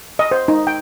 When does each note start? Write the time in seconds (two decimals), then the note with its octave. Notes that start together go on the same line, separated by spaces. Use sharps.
0.19 D#5
0.31 C5
0.48 D#4
0.67 G5